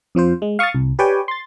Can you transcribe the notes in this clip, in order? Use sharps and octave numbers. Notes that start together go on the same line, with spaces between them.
F2 F3 F4 C5
G#3
F5 C#6 D#6 F6 A6
C2
G4 B4 C#5 D5 G5 G#5
C6 A6